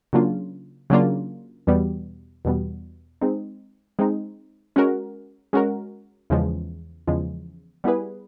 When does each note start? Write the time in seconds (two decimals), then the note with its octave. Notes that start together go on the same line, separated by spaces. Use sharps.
0.13 C#3 F#3 A#3 D4 F4
0.90 C#3 F#3 A#3 D4 F4
1.67 E2 B2 G3 B3
2.45 E2 B2 G3 B3
3.21 G#3 C4 D#4
3.99 G#3 C4 D#4
4.76 G#3 C#4 F#4 A#4
5.53 G#3 C#4 F#4 A#4
6.30 E2 C#3 F3 G#3
7.07 E2 C#3 F3 G#3
7.84 G3 B3 E4 G#4 B4